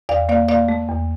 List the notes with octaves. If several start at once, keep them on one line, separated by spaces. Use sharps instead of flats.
E2 D5 F5
A#3 D5 F5
A#3 D5 F5
A3
E2